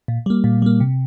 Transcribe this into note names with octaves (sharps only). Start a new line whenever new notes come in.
A#2
G3 A#3
A#2
G3 A#3
C3